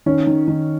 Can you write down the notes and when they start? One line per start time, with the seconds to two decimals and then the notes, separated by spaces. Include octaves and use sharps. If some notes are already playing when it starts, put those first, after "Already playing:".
0.06 D#3 C#4
0.27 D#3
0.48 D#3